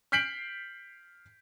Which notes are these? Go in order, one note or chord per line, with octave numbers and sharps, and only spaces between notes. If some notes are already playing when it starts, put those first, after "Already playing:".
F6 G6 B6 C7 D7 F#7